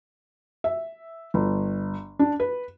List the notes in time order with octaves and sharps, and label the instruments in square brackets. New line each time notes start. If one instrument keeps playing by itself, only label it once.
[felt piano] E5
G1
D4
B4